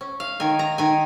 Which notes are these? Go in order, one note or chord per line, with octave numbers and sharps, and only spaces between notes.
C#4
F5
D#3 G#5
A#5
D#3 G#5